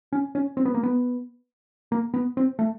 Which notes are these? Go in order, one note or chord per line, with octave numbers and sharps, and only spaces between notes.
C#4
C#4
C4
B3
A#3
B3
A#3
B3
C4
A3